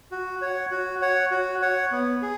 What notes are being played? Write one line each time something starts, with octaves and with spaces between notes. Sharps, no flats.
F#4
C#5 F#5
F#4
C#5 F#5
F#4
C#5 F#5
B3
G#4